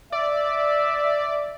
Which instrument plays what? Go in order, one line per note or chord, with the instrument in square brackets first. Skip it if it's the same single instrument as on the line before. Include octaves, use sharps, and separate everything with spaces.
[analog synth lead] D5 [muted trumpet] E5